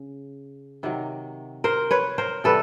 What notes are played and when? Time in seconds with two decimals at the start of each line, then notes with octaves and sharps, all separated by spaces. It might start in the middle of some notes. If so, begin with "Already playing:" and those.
Already playing: C#3
0.83 C3 D#3 F#3
1.64 A#4 C5
1.91 B4 C#5
2.18 A#4 C5
2.44 C3 E3 G3 A4 B4